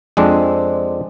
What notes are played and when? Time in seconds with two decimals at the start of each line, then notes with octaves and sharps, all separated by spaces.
0.17 F2 G#3 C4 D4